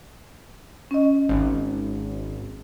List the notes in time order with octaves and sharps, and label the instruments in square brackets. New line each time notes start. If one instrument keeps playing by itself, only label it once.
[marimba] C#4 D#5
[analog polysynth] G#1